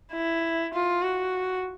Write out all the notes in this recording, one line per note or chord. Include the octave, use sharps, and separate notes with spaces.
E4
F4
F#4